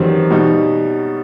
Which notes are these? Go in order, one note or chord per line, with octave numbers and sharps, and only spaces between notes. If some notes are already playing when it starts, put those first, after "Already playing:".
Already playing: F#2 D#3 E3 G3 C4
B2 G3 D#4